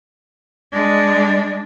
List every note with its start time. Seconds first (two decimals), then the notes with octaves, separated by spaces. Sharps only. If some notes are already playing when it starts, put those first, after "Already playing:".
0.73 G#3 D4